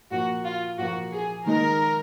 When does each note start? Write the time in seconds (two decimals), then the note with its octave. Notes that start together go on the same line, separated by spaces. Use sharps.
0.11 A#2 F3 A#3 F#4
0.45 F4
0.78 A#2 F3 A#3 F#4
1.12 G#4
1.46 D#3 G#3 D#4 A#4